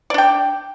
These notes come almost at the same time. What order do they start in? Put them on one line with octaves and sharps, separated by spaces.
D5 D4 G5